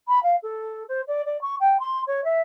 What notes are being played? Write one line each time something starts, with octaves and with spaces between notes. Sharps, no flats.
B5
F5
A4
C5
D5
D5
C#6
G5
C6
C#5
E5